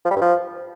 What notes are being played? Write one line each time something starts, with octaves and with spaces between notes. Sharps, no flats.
F3
G3
G2
F3